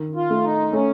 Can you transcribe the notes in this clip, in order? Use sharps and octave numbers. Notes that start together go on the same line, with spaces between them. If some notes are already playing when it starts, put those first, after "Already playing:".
Already playing: D#3
F4
A3
D#4
A3 C#4